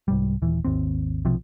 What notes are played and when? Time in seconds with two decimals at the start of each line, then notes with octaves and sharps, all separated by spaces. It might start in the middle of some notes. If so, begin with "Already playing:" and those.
0.08 C2 G#2 G3
0.42 D#1 E3
0.65 G#1 D#2 C4
1.25 B1 C3 F3